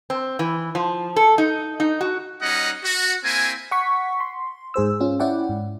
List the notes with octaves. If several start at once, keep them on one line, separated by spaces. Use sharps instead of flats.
C4
E3
F3
A4
D#4
D#4
F#4
G3 C#4 D#4 D#5 F#5
F#4
A#3 C4 E4 G#5
F#5 C#6 B6
C6
G#2 G#4 C5 E6
C#4 F4
C#4 E4 D5 F#5 G5
G#2